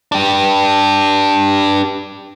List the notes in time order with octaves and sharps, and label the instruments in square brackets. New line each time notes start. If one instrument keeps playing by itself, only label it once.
[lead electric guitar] D4 G4